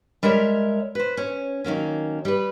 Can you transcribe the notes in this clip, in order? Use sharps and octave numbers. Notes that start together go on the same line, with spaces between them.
G3 G#3 A#4 C#5 E5
B4 C5
C#4
D#3 F#3 A#3 C#4
G3 B4